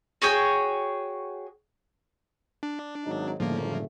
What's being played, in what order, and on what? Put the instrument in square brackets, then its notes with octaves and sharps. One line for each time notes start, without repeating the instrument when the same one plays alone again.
[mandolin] F#4 G#4 C#5 G5
[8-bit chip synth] D4
[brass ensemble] G#1 F#3 D#4
[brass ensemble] F#1 B1 A3 [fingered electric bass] A2 D3 G3 [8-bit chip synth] F3 A#3